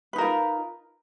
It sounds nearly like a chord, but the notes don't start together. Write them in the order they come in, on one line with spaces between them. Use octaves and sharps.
B4 D#4 A#4 F4